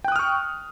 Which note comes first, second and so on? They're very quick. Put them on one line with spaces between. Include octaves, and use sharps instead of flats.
G5 F#6 D#6 F6 C#6